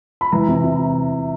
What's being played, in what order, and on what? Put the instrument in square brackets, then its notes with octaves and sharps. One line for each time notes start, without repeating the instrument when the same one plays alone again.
[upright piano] B5
E3 A#5
C3
C3